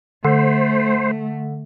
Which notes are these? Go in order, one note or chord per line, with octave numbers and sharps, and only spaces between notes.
D3 A3 C5